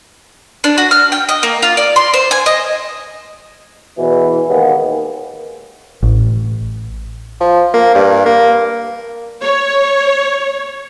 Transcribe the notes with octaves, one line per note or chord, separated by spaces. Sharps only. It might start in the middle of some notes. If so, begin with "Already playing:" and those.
D4
F#4
F6
G5
D#5
A#3
F4
D5
C6
C5
G#5
D#5
E2 B2 E3
D#2 D#3 G#3 A#3 B3
A1
F3
A#3
G2
A#3
C#5